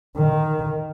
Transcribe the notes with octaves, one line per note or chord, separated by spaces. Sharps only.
D#3